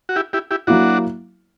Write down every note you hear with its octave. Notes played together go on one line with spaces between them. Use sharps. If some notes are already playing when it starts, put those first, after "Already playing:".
F#4
E4 G4
E4 G4
E4 G4
F#3 A#3 D4 E4 F#4